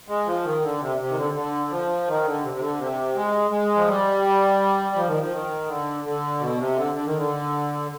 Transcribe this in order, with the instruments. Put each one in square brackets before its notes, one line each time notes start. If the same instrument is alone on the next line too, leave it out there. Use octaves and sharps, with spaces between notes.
[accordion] G#3
F3
D#3
D3
C3
C3
D#3
D3
D3
F3
D#3
D3
C3
C3
D3
C3
G#3
G#3
F3
G3
F3
D#3
F3
D#3
D3
D3
B2
C3
D3
D3
D#3
D3